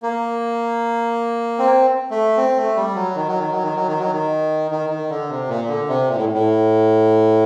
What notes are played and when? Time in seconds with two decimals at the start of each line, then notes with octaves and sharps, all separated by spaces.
0.03 A#3
1.59 C4
2.11 A3
2.37 C4
2.57 A3
2.76 G3
2.95 F#3
3.16 D#3
3.27 F#3
3.39 D#3
3.51 F#3
3.63 D#3
3.75 F#3
3.88 D#3
3.99 F#3
4.12 D#3
4.71 D#3
4.90 D#3
5.10 D3
5.29 C3
5.48 A#2
5.68 D3
5.88 C3
6.08 A#2
6.16 A2
6.34 A2